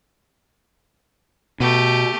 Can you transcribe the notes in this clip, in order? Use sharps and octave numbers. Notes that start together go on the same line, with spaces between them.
B2 A3 G4